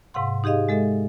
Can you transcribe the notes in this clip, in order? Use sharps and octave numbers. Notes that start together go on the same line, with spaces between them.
G#2 C3 F5 F#5 C6
D#4 G4 G#4 D#5 F5
G#3 A4 D#5 E5